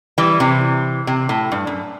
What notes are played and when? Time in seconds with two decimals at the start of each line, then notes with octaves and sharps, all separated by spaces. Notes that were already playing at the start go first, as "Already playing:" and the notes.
0.18 E3 G3
0.40 C3 E3
1.07 C3
1.29 A2
1.52 G2
1.67 F#2